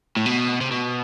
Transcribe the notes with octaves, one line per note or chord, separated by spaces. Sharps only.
A2
B2
C3
B2